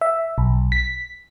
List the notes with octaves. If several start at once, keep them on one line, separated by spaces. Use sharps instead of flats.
E5
B1
B6